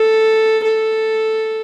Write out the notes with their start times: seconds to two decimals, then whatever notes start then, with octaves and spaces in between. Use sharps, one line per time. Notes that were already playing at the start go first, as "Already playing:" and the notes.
Already playing: A4
0.63 A4